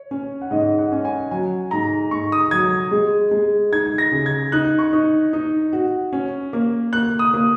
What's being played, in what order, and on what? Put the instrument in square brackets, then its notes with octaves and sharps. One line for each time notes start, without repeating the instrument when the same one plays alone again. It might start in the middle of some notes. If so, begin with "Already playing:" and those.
Already playing: [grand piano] C#5
[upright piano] C#4
[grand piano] F#5
[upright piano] G#2 [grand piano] D#5
[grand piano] F#5
[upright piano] C#4
[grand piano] G#5
[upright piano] F#3 [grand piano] G#5
[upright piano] G#2 [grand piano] A#5
[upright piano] G#2 [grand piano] C#6
[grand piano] D#6
[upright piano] F#3 [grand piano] G#6
[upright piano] G#3
G#3
[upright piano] D#4 [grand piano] G#6
[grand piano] A#6
[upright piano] C#3
[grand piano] G#6
[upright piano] D#4 [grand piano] F#6
[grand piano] C#6
[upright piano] D#4
D#4
F#4
C#4
A#3
[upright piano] A#3 [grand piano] F#6
[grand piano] D#6
[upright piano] A#3